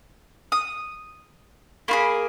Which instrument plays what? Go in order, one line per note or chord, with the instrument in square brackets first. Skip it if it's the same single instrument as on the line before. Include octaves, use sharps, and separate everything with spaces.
[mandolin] D#6
A#3 F4 G#4 B5